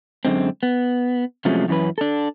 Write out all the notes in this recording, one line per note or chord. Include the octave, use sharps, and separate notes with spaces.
F#2 D3 G#3 C4
B3
C3 F3 F#3 G#3 A3 C#4
F#2 E3 C#4 B4
D4 A4